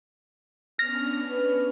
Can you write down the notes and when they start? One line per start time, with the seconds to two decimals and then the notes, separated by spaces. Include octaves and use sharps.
0.79 B3 C#4 D4 F6 A#6
1.31 B4